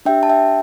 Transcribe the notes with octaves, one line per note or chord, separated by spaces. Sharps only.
D4 G4 E5 G5
A5
E5 G5